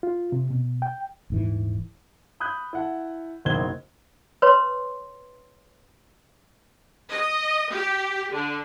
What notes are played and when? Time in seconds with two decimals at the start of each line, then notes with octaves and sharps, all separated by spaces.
0.03 F4
0.32 C3
0.50 B2
0.82 G5
1.30 D#1 G#2 E3
2.40 B5 D#6 F#6 G6
2.73 E4 F#5 A5
3.45 F#1 B1 C5 G#6 G7
4.42 B4 C#5 C6
7.11 D#5
7.71 G4
8.32 D3